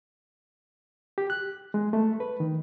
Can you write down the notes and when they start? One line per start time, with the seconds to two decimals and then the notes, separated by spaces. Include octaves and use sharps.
1.18 G4
1.30 F#6
1.74 G#3
1.93 A3
2.20 B4
2.40 D#3